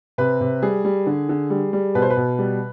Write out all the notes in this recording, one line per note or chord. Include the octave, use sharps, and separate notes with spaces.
C3 B4
C3
G3 G#4
G3
D3
D3
G3
G3
B2 B4
C5
B4
B2
G3